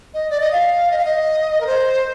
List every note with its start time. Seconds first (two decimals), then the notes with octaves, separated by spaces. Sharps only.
0.14 D#5
0.30 D5
0.40 D#5
0.52 F5
0.91 D#5
0.98 F5
1.05 D#5
1.61 A#4
1.67 C5